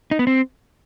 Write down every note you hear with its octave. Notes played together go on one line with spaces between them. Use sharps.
D#4
B3
C4